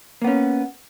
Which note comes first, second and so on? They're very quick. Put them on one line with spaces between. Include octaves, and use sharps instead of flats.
A#3 B3 C#4